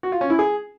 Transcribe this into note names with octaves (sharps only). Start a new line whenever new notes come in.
F#4
F4
C#4
E4
G#4